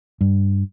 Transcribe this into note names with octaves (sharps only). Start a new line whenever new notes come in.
G2